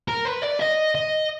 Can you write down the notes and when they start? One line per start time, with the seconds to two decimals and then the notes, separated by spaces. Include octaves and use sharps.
0.08 A#4
0.26 B4
0.43 D5
0.60 D#5
0.95 D#5